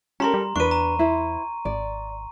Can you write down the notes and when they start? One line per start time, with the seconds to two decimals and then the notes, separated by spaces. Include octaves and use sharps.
0.20 C#4 G4 A4 A#4 A#5 C6
0.34 G3
0.56 E2 D4 B4 C#6 D#7
0.71 A#5
0.99 E4 C5
1.65 G#1 D5